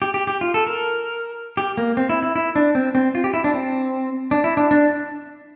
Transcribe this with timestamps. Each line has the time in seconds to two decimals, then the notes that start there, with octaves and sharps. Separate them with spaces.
0.02 G4
0.14 G4
0.27 G4
0.41 F4
0.54 A4
0.67 A#4
1.57 G4
1.77 A#3
1.97 C4
2.09 E4
2.23 E4
2.36 E4
2.56 D4
2.75 C4
2.95 C4
3.15 F4
3.24 G4
3.34 E4
3.44 D4
3.54 C4
4.31 D4
4.44 E4
4.57 D4
4.71 D4